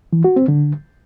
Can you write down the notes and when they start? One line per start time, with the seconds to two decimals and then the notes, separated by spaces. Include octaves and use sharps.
0.13 E3
0.24 F#4
0.36 C4
0.48 D3